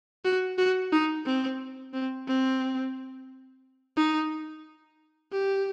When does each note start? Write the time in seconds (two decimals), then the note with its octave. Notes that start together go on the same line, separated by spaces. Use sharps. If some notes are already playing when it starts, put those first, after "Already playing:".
0.24 F#4
0.58 F#4
0.92 D#4
1.26 C4
1.93 C4
2.27 C4
3.97 D#4
5.32 G4